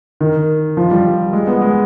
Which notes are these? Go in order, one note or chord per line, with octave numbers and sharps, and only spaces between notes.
D#3
F3
G3
G#3
B3
G#3